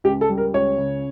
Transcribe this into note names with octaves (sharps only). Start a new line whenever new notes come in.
C#2 G4
A4
G3
A#4
C#2 C#5
C#3